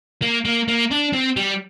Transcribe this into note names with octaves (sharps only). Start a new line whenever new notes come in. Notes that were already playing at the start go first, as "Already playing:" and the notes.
A#3
A#3
A#3
D4
C4
G3